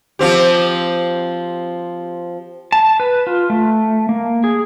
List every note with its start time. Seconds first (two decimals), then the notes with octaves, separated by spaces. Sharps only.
0.19 F3 C4 G4
2.72 A5
3.00 B4
3.27 F4
3.50 A3
4.09 A#3
4.44 G#4